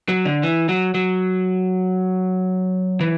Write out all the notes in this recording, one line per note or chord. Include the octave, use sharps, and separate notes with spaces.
F#3
D3
E3
F#3
F#3
E3